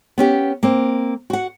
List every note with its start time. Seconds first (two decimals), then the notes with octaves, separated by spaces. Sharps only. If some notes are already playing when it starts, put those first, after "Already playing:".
0.18 B3 C#4 G4
0.63 A#3 C4
1.30 F#4 F#5